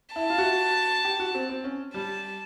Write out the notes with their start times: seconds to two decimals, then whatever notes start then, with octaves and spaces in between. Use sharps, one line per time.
0.16 E4 A5
0.30 F4
0.38 F#4
1.05 G4
1.20 F#4
1.35 C4
1.50 C4
1.64 C#4
1.94 G3 A5